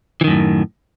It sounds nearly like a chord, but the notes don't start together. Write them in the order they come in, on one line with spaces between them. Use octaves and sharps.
E3 D#3 F#2 A2